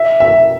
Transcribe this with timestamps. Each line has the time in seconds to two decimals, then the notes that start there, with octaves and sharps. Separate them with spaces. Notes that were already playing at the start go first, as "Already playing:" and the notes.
Already playing: E5
0.20 E5